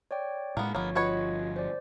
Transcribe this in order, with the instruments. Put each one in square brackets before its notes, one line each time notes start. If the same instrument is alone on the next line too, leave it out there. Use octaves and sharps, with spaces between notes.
[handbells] C#5 D5 G5
[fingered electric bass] A2 G3 G#3 [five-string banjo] A#3 B3
[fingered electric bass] G1 F3 [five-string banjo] A#3 B3 [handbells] C#5
[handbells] F4 D#5 G#6 [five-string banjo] F#4 B4 C#5
[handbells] C5 D5